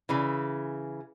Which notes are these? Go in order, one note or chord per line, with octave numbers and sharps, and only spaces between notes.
C#3 E3